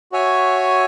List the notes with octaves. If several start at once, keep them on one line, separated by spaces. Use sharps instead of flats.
F#4 C#5 E5 G#5